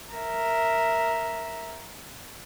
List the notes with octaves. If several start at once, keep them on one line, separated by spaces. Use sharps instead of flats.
A#4 E5